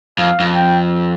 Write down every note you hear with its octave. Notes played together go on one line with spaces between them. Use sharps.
F2 F5
F2
G5